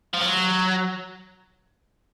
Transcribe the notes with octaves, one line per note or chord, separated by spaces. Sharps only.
F3
F#3